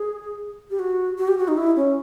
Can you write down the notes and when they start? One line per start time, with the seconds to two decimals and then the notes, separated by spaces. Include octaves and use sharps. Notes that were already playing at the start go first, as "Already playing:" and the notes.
Already playing: G#4
0.71 G4
0.79 F#4
1.18 F#4
1.28 G4
1.38 F#4
1.48 D#4
1.57 E4
1.76 C#4